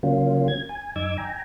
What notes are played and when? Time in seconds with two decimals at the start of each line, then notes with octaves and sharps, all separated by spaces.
0.03 C#3 F#3 A#3 C#4 F4
0.48 G#6
0.69 G#5
0.96 F#2 D#4 D6 E6 G#6
1.17 G5 G#5 A#5